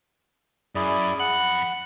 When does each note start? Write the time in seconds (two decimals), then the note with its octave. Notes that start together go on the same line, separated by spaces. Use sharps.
0.75 F#2 E4 G#4 D5
1.20 F2 F#5 B5